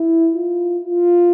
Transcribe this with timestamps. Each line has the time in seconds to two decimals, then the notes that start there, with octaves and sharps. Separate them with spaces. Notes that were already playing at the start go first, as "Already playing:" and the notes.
Already playing: E4
0.34 F4
0.85 F4